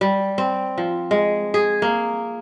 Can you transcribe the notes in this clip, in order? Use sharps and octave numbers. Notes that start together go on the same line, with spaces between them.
G3
C4
F3
G#3
G#4
A#3